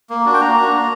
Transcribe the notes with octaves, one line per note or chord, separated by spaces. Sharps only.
A#3
D4 F#4
G5
A#3 A#5
D4 F#4
A#3